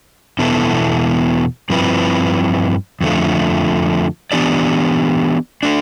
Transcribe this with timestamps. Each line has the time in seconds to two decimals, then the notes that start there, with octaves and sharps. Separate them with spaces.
0.39 E2 B2 B3 E4 A4
1.70 G2 F3 C4 E4 B4
3.01 F2 D3 F3 A3
4.32 E3 B3 D4 G4 D5
5.63 D3 A3 D4